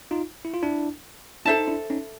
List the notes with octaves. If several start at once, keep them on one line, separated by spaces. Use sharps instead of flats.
D#4 F4
E4
F4
D4 E4
D4 E4 A4 C5 E5 A5
D#4
D4 E4
C#4 D#4